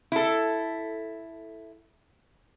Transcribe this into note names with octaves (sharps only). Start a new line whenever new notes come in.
E4 A4